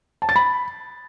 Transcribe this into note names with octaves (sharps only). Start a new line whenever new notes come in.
A5
A6
B5